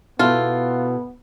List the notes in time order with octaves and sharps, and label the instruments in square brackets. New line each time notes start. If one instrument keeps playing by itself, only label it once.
[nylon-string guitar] B2 E4 A4 [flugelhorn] B3 [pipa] F4